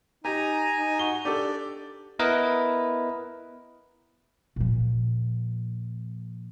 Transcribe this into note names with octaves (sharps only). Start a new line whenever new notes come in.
D#4 G4 G#5 A#5
D#4
F#4 G7
D4 G4 A4 D5
B3 E4 A#4 B4 D#5
A#2 F3